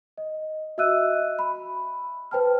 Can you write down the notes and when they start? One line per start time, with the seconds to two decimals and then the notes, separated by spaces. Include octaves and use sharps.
0.18 D#5
0.78 F#4 D#5 E5 E6 F#6 D#7
1.39 B5
2.31 B4 C5 G5 A5 F6